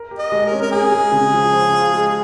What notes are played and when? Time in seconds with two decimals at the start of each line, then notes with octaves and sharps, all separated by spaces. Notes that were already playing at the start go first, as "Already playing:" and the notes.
Already playing: A#4
0.11 G4
0.19 D#5
0.32 G#3
0.46 A#4
0.51 C#4
0.62 A#4
0.72 C#4 G#4
0.92 G#3
1.12 C#3
1.33 F3
1.53 C5
1.73 F4
1.93 G#3